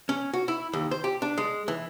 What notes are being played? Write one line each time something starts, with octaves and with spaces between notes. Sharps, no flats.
C#4
F#4
E4
D#2
C5
G4
D4
G#3
E3